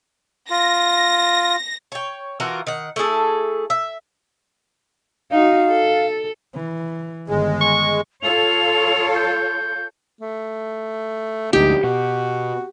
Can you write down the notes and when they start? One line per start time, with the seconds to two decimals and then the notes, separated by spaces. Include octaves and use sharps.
0.50 F4 A#6
1.92 C#5 G5
2.40 E3 F4 F#4 A#4
2.67 D#3 F#5
2.96 A3 E4 G#4 A4
3.70 E5
5.31 D#4 F#4 F5
5.70 A4
6.54 E3
7.28 G1 D#3 G#3
7.61 C#6
8.22 F4 A4 C#5 F7
9.15 G6
10.21 A3
11.53 D2 G#2 D#4 G4
11.84 B2 F#4